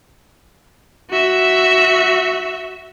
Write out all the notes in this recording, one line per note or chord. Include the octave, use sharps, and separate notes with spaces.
F#4 E5